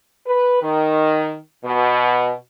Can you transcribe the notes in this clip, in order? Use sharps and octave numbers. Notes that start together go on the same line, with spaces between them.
B4
D#3
B2